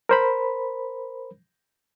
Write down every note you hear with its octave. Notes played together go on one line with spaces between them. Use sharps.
A#4 C5 B5